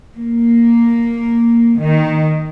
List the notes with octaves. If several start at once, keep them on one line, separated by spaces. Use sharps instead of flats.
A#3
D#3